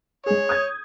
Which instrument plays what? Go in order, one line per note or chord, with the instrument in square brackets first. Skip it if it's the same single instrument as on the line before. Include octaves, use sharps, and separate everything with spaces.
[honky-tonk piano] G#3 G#4 [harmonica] C#5
[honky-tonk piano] D#6 G6 G#6